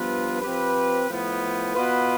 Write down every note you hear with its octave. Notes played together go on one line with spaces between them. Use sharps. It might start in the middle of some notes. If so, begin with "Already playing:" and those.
Already playing: G2 F3 B3 F4 B4
F3 C4 G4 B4
A2 F3 B3
B2 B3 F4 B4